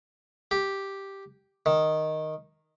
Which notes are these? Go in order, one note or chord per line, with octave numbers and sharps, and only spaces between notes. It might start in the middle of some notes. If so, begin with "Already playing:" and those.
G4
D#3